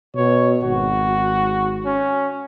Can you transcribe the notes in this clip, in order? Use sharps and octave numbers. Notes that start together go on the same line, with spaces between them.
B2 C#5
G#1 F#4
C#4